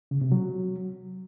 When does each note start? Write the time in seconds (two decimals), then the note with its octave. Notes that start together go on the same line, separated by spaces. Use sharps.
0.11 C#3
0.21 C3
0.32 F#3